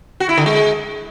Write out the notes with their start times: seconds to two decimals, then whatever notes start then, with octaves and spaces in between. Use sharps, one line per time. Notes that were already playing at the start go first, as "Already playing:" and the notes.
0.20 F#4
0.29 E4
0.37 D3
0.46 G#3